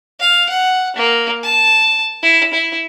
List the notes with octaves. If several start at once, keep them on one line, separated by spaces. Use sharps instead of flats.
F5
F#5
A#3
A5
E4
E4